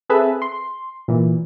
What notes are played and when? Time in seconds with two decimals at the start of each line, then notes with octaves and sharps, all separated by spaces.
0.09 C4 G#4 A4 B4 E5
0.42 C6
1.08 A#2 E3